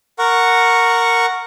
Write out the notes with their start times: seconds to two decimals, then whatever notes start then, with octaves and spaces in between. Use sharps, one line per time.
0.19 A#4 F#5 C#6